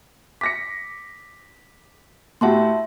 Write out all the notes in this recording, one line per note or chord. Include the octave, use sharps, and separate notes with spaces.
D6 A#6 B6 C#7
A2 F#4 G4 E5 A5 C6